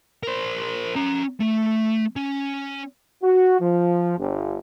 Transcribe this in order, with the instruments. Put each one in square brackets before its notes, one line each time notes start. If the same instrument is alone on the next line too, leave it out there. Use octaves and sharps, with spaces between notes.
[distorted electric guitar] A#4 C5
C#4 A#5
A3
C#4
[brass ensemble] F#4
F3
G1